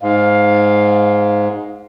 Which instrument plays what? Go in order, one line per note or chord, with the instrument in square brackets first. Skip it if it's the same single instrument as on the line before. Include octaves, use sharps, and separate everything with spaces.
[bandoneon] G#2 [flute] F5